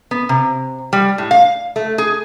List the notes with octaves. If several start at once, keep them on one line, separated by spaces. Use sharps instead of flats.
B3
C3
G3
A2
F5
A3
G#4